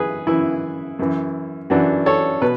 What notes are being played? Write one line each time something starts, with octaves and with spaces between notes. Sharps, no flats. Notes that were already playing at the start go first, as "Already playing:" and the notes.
Already playing: F#2 E3 G#4 B4
F#2 E3 E4
F#2 E3
F#2 E3 D4 F#4
A4 C#5
B2 B4